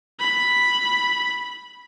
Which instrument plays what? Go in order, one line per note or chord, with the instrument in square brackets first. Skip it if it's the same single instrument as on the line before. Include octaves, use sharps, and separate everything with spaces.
[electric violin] B5